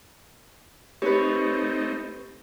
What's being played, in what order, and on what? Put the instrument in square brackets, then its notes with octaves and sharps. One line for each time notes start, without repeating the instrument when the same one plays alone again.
[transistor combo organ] A3 C4 D#4 [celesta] G4 [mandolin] B4 C#5